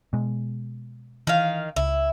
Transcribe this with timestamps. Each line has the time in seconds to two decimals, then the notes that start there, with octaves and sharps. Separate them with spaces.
0.13 B2 G#3
1.27 D#3 E3 F5
1.76 C#2 E4